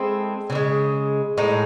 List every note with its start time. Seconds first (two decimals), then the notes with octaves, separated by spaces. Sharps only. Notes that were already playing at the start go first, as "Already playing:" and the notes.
Already playing: G#3 C4 E4 A4
0.50 C#3 E3
0.55 G#3
1.37 A2 G#3 D#4